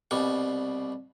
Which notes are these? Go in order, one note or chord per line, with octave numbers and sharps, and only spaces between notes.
C2 B2 G3 C#6